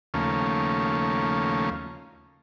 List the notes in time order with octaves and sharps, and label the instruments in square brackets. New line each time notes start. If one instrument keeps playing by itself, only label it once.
[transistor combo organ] D#2 C#3 F3 A3 A#3 C#4